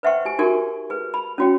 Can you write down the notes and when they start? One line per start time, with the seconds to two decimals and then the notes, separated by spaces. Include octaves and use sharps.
0.03 B4 C5 E5 F#5 G5 C#6
0.25 G4 G#5
0.39 D#4 F#4 G4 A#4 G#5 C#6
0.90 G#4 B4
1.14 B5
1.38 C#4 F4 F#4 C#5 G5